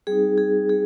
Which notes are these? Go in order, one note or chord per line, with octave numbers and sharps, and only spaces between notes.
G3 C4 D#4 G#4
G#4
G#4